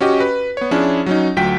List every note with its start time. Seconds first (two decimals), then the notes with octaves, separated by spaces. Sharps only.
0.01 C#4 F#4 G4 D#5
0.20 B4
0.57 B3 C#5
0.71 F3 C#4 D4 E4 G#4
1.06 F#3 C#4 D#4
1.36 D2 F#3 F4 G5 B6